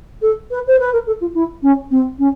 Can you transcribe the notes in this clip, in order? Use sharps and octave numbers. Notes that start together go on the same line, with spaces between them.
A4
B4
C5
B4
A#4
A4
F4
E4
C#4
C4
C#4